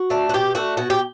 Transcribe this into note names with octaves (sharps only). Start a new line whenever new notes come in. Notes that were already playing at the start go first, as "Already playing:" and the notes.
Already playing: F#4
A3 D4
F#4
B2 G4
A3 D4 F#4
B2 F#4
G4